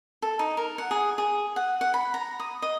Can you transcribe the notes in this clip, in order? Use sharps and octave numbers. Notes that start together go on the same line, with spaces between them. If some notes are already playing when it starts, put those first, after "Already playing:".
A4
D#4
A#4
F#5
G#4
G#4
F#5
F#5
B5
A#5
D#6
D#5